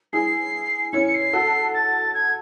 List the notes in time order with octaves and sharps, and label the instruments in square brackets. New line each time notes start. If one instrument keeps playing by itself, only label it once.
[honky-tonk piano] E4 G#4 [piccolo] C7
[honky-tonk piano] C#4 E4 [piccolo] C#7
[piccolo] C#7
C7
[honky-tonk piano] F#4 A4
[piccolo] A6
G#6